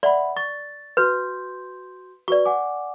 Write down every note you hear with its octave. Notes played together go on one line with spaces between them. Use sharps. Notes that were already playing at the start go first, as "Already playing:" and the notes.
D5 E5 F#5 B5 C6
C#6 A6
F#4 B4 C6 G6
F#4 B4 D5 C#6
F#5 G#5 D6